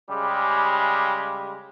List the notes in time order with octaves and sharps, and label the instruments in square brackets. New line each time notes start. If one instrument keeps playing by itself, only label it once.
[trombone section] C#3 G3 G#3 G4